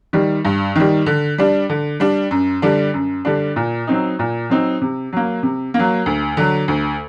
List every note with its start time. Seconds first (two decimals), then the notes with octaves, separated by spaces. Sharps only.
0.13 D#3 G3
0.45 G2
0.76 D#3 G3
1.06 D3
1.38 G3 D4
1.69 D3
2.00 G3 D4
2.31 F#2
2.62 D3 G3 D4
2.94 F#2
3.25 D3 G3 D4
3.56 A#2
3.87 F#3 C4 D#4
4.19 A#2
4.50 F#3 C4 D#4
4.81 C3
5.13 F#3 A#3
5.43 C3
5.74 A#3
5.79 F#3
6.06 D2
6.37 D3 F#3
6.68 D2